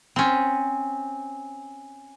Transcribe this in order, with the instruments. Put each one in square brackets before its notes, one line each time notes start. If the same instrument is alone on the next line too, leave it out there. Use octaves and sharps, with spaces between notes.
[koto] C4 C#4